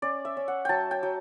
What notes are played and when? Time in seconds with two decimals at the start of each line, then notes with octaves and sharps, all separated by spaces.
0.02 C#4 D5
0.25 E5
0.37 C#4
0.48 F#5
0.65 F#3 G5 A5
0.91 G5
1.03 F#3